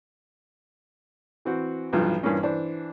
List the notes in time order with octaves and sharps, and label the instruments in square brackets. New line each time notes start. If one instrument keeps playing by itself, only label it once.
[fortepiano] E3 C4 F#4
B1 G2 E3 F3
G2 A#2 E3 A#3 C#4
E3 D4 C5